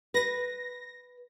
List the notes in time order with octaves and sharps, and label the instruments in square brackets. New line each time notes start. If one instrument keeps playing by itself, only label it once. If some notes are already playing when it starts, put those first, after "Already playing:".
[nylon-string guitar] B4 [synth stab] A#6